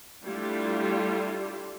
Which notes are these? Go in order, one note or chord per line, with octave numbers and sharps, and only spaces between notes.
G3 A3 D4 E4 F4 G4